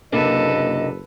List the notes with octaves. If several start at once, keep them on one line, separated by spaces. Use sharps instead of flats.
F#1 C3 A#3 D4 A4 B4 D#5